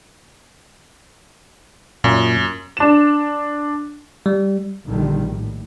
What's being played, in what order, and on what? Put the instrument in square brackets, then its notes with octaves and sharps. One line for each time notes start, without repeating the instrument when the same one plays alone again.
[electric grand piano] F#2 [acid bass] A#2
[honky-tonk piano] D4 E7
[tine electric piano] G3
[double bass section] A#1 D3 D#3 G3
A2